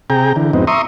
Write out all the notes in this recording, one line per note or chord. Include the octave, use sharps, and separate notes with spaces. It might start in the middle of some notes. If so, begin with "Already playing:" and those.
C3 G#4 G5 A#5
D3 E3
F2 G#2 B3 C4 D#4
E5 A#5 C6 C#6 D#6